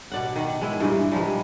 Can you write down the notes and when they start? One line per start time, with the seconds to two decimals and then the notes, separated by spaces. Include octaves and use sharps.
0.12 B2 D5 F#5
0.36 D#3
0.62 G#3 E4
0.80 G2 A#2 E3
1.12 A#2 F3 G3 G#3